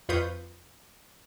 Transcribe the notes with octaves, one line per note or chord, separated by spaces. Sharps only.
F2 F4 B4 C#6 D#6 G6